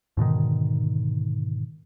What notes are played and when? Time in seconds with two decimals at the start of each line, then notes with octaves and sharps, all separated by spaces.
0.17 G#2 B2 D3 D#3